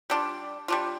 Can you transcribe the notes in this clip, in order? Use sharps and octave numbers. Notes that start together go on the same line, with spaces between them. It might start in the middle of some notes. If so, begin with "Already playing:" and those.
G3 D4 F4
G3 D4 F4